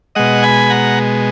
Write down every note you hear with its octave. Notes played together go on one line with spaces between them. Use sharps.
B2 G#3 D#5 F#5
G#5 B5
F#5 A#5